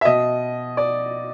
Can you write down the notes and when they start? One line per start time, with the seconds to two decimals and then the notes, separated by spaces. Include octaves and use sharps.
0.01 E5
0.05 B2 D#5
0.77 D5